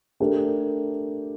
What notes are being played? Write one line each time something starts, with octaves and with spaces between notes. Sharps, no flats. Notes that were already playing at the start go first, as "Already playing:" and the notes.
A3 D4 G4 A#4